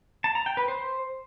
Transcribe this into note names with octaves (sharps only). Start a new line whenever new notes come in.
A5
A#5
G5
B4
C5